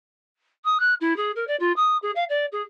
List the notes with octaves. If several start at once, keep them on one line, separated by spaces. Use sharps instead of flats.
D#6
F#6
E4
G#4
A#4
D5
F4
D#6
G#4
F5
D5
G#4